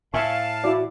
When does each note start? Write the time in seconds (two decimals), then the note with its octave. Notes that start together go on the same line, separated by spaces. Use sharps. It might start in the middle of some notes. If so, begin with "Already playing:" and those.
0.14 A2 E5 F5 G#5 A5 C#6
0.64 E4 F#4 D5